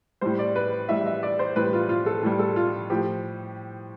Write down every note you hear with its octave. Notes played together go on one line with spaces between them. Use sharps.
A2 G3 C5
D5
B4
A2 G3 E5
E5
D5
C5
A2 G3 B4
F4
F4
A4
A2 G3
A4
F4
A2 F3 G4